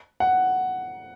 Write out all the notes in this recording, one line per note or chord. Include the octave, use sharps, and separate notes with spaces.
F#5